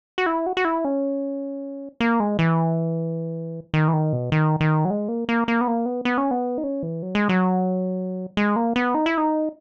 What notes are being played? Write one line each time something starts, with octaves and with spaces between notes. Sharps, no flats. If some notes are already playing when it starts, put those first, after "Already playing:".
F#4
E4
F#4
F#4
E4
C#4
A#3
G#3
E3
D#3
E3
D#3
B2
D#3
D#3
F#3
G#3
A#3
A#3
A#3
B3
A#3
B3
B3
C#4
B3
D#4
C#4
E3
F#3
G#3
F#3
G#3
A#3
B3
D#4
E4
D#4